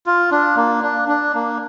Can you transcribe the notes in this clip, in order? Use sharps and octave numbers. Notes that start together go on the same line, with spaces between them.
F4
D4
A#3
D4
D4
A#3